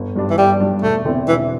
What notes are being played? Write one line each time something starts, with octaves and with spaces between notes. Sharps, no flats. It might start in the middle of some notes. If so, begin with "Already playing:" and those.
Already playing: G1
G2 G3 D4
E3
G1 G3
G2 G3 D4
E1 A3
E2 D3 C4 E4
E1 E3